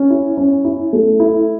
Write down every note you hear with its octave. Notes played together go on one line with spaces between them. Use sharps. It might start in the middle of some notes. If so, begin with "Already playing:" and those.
Already playing: C#4
E4
C#4
E4
A3
E4